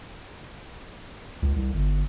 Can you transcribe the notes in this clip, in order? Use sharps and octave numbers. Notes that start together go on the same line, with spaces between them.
C#2
C2
G1